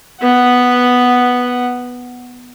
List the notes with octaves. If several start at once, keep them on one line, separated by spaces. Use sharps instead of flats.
B3 F#5